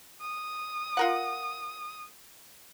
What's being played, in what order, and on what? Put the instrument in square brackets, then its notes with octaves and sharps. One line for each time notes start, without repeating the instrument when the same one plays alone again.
[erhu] D#6
[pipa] F4 A#4 F#5